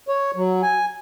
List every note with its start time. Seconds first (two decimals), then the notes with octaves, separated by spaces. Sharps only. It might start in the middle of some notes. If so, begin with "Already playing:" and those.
0.08 C#5
0.36 F#3
0.62 G#5